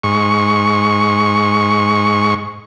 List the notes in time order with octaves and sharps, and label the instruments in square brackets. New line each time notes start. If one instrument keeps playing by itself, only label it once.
[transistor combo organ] G#2 C#6